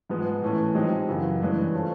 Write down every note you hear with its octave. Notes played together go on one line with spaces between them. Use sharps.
G#2 F3 G#3 B3
A2 E3 A3 C#4
F3 G#3 C4 D#4 G4
F#2 C#3 E3
G2 E3 G#3 C#4
A3 C#4 F4 A4 C5